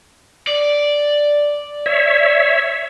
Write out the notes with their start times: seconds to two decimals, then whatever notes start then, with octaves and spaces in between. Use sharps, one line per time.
0.47 D5
1.86 C#5 E5